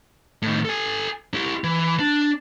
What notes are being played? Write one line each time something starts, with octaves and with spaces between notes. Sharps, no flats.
A2 D#3
A4 G#5
E4 G4
E3
D4